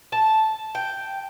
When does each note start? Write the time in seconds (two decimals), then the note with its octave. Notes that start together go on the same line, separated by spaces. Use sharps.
0.12 A5
0.75 G5